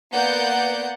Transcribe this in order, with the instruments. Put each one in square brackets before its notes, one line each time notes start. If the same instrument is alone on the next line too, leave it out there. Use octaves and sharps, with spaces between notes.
[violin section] A#3 B3 D5 F#5 G6